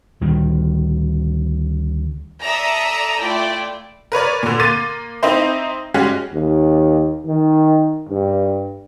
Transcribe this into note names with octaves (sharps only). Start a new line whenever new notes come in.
D2 D#3 G3
A4 D5 E5 A#5 D#6 E6
A3 E4 F4 D5 G5
A#4 B4 C#5 D5
A#2 D3
A#3 C6 D6 A6 D#7
C4 D#4 E4 C5
G3 G#3 C#4 F#4
D#2
D#3
G2